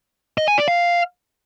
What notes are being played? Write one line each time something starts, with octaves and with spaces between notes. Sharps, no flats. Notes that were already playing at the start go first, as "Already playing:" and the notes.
D#5
G#5
D5
F5